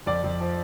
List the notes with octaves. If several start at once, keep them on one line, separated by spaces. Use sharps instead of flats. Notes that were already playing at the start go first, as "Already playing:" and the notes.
F2 D5
F2
F3